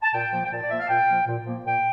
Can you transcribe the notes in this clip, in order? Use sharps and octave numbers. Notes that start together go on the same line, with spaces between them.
A5
A#2 G5
F3 A#3
G5
A#2 A5
D5
F3 A#3 E5
F5
A#2 G5
F3 A#3
A#2
F3 A#3
A#2 G5